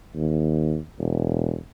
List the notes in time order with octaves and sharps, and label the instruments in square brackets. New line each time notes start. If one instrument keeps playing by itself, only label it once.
[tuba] D#2
E1